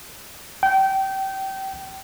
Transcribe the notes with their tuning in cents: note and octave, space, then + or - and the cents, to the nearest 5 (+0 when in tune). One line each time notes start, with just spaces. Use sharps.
G5 -25